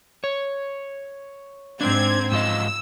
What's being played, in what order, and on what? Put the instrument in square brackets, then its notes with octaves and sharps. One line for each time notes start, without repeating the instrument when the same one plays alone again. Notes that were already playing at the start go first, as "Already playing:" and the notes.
[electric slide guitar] C#5
[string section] G#2 C4 G#6 [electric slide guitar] D4
[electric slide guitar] G#2 F4 D#5 [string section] E6